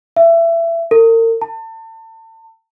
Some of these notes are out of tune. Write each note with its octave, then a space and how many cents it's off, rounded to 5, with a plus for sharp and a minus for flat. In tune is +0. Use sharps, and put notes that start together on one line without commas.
E5 +25
A#4 -40
A5 +35